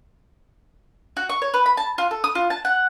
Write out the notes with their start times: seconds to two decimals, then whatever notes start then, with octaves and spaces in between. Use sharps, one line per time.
1.17 F#4
1.29 C#6
1.42 C#5
1.54 B4
1.66 B5
1.77 A5
1.98 F4
2.11 A4
2.24 D#6
2.35 F4
2.50 A5
2.65 F#5